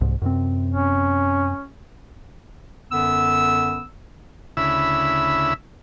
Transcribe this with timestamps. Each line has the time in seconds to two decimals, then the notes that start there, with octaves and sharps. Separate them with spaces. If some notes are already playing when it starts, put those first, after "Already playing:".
0.01 C2 G#2
0.22 F#2 C3 C4
0.72 C#4
2.92 F#2 D3 B3 E6
4.57 D2 C#3 E4 E5 B5 E6